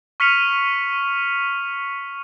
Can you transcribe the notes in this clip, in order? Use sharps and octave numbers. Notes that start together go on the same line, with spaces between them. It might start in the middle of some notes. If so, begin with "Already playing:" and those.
C#6 F6 B6 C#7 D#7 F7